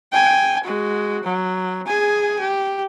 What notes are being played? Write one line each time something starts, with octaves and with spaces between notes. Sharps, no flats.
G5 G#5
G#3 F#4
F#3
G#4 G#5
G4